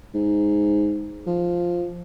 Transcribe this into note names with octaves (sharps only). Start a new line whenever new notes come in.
G#2
F3